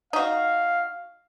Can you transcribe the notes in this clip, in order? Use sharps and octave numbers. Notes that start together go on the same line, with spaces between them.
D#4 F#4 F5